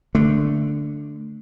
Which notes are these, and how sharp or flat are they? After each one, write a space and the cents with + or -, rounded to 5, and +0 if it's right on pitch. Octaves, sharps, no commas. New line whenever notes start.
D3 +0 A3 +0